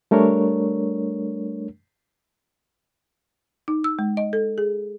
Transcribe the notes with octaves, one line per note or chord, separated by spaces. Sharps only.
G3 A3 D4 A#4 C#5
D#4
E6
G#3
D#5
A4
G#4